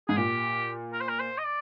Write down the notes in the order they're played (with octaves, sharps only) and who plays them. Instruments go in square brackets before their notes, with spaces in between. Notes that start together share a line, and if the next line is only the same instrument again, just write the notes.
[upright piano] G#2 [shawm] G#4
[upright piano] A#2 [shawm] G4
[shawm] A#4
C5
A#4
C5
D#5
D5